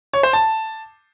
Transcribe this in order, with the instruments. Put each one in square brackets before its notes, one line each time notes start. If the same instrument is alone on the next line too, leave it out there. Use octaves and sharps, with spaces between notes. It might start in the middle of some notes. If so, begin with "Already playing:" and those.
[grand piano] C#5
C5
A5